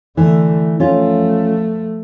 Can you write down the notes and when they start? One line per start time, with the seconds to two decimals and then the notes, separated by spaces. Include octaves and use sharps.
0.17 D3 E3 A3
0.80 F3 A3 C#4 F4